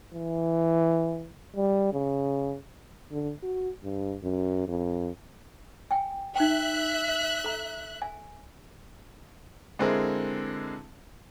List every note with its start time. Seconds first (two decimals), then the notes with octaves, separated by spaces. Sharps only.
0.14 E3
1.56 G3
1.93 C#3
3.11 D3
3.43 F#4
3.84 G2
4.23 F#2
4.68 F2
5.91 G5 G#5
6.36 D#4 E5 G5 F#6
7.44 A4 A#5
8.02 G#5
9.79 D3 G#3 C4 E4 G#4 A#4